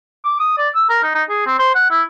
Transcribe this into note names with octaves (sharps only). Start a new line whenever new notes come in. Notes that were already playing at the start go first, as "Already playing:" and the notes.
D6
D#6
D5
E6
A#4
D#4
D#4
G#4
C4
C5
F#5
E4